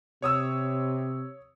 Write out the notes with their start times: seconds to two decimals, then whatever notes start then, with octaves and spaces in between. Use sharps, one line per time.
0.22 C3 C#5 D#6 E6